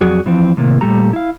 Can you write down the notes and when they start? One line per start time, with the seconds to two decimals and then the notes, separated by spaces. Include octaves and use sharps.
0.01 F2 F#3 F#4 G#4 D5
0.26 E3 F3 C4
0.57 A2 C3 D#3 A#3
0.81 A#2 G3 A3 G4 A4 A#5
1.13 E4 F5